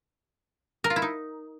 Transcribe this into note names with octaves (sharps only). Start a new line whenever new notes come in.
A#4
F4
E4
D#4